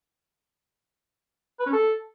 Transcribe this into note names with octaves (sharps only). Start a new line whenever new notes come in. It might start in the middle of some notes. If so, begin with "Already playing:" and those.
B4
C#4
A4